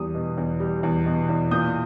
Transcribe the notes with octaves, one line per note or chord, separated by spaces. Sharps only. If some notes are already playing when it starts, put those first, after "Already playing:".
Already playing: E2 G3 D#6
B2
E2
G3
E2
B2
E2
A#2 D#6 G6